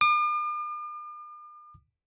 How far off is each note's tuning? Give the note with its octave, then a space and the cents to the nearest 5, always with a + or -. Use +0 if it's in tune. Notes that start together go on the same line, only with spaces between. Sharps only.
D6 +45